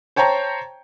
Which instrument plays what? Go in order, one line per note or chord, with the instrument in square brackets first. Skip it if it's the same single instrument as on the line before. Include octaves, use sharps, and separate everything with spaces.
[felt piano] C5 C#5 G5 A5 A#5